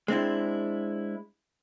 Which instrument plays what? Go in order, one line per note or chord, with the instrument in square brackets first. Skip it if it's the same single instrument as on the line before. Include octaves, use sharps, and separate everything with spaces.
[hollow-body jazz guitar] G#3 C4 D4 E4